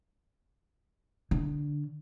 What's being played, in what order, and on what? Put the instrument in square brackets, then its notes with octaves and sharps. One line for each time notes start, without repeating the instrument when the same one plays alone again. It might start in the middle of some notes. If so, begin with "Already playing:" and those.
[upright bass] D3